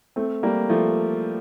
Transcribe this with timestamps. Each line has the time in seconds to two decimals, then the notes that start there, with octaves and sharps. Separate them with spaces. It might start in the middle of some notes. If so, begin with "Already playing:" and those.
0.16 A3 C4
0.43 G3 A#3
0.69 F3 A3